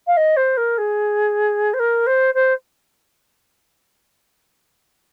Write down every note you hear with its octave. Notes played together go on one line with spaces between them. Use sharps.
F5
D#5
C5
A#4
G#4
C5
A#4
C5
C5